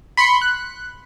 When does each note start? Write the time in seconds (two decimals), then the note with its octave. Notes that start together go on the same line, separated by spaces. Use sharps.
0.17 B5 C6 B6 C#7
0.42 F#6